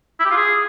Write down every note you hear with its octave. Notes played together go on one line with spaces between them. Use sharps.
E4
G4
F4
G#4